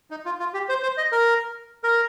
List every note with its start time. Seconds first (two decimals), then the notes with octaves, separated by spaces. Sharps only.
0.11 D#4
0.25 F4
0.40 F4
0.54 G4
0.69 C5
0.83 C5
0.97 D#5
1.12 A#4
1.84 A#4